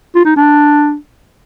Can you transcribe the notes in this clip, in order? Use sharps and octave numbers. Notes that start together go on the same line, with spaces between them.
F4
D#4
D4